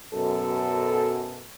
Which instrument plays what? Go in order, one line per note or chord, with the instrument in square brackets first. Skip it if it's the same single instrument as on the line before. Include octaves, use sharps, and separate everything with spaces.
[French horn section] F#2 B2 A4